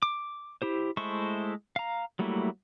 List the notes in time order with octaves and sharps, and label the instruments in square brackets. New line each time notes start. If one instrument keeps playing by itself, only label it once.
[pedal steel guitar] D6
E4 G4 C5
G#3 A3 E4 C5 C#6
F5 A#5
F#3 G3 A3 A#3 E4